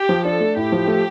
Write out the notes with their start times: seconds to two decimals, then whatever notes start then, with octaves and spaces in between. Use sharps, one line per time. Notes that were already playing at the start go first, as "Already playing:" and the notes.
Already playing: G4
0.09 F3
0.25 D4 A4
0.40 A3
0.56 A2 G4
0.72 F3
0.87 A3